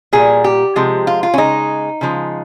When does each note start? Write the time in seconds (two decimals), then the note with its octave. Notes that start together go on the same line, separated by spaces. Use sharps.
0.13 A#2 G3 G#4
0.44 G4
0.76 C3 F3 G#3
1.07 F4
1.23 F4
1.34 C#4
1.38 C#3 G#3 D#4
2.01 C#3 F3 G#3